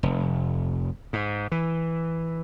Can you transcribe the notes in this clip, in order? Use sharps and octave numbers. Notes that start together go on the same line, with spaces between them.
F1
G#2
E3